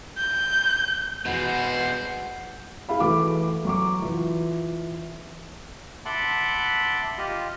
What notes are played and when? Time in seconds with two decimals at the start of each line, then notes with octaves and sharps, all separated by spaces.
0.17 G6
1.25 B2 G#3 F#4 B4 C5 F#5
2.89 E4 G#4 F5 B5
3.00 E3 A3 F#4 D6
3.65 F#3 C#6 D6
4.02 E3 F4
6.05 E5 F#5 A5 B5 C6 D6
7.18 F4 G4 D#5